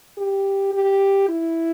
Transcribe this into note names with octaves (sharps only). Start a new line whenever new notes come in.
G4
G4
E4